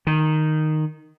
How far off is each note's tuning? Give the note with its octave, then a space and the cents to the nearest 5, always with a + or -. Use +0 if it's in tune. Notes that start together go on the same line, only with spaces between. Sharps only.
D#3 -5